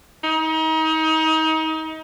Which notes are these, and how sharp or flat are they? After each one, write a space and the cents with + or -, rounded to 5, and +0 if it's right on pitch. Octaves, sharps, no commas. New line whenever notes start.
D#4 +30